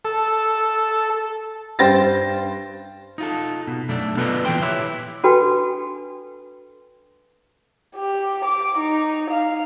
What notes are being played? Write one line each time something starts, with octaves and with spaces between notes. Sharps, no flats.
A4
G2 C5 G5 A6 A#6
D#4 F4 A4
B2
F#2 B2 A3 D4
B3 F4 A4 B4 D5 D#5
A#2 E3 F3 G5 C6
E4 G4 B4 C#5 E5
D4 F#4 A4 B4 G5 B5
G4
D6
D#4
F5